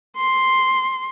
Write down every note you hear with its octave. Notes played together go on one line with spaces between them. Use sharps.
C6